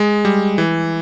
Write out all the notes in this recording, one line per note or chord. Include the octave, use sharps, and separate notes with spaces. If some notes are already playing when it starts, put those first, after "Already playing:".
Already playing: G#3
G3
E3